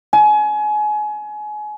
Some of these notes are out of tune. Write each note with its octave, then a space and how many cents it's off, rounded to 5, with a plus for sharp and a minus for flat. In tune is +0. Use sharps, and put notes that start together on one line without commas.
G#5 +30